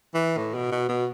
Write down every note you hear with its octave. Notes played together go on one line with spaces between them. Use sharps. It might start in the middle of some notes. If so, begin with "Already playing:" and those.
E3
A2
B2
B2
B2